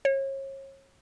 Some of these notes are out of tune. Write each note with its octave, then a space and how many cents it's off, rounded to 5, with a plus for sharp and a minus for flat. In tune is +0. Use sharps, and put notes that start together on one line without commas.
C#5 -35